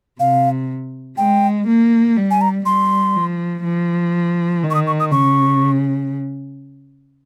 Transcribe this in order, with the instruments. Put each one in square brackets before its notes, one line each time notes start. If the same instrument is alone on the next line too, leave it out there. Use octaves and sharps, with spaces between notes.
[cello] C3 [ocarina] F5
[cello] G#3 [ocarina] G5
[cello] A#3
G3
[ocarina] G#5
A#5
[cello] G3 [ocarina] C6
[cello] F3
F3
D#3
[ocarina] C#6
D#6
C#6
D#6
[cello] C#3 [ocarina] C#6